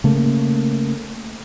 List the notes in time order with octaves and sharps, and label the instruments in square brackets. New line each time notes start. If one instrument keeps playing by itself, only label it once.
[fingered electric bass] C#3 A3 A#3